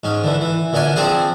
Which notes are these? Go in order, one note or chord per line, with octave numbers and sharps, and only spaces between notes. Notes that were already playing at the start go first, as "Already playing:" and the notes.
G#2 C#4
D3 E3
E3
A#1 D3 C#4 D4 G#5
F3 C4 D4 G#4 C5